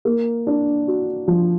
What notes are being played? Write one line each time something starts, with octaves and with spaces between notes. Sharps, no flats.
A#3
D4
F#4
F3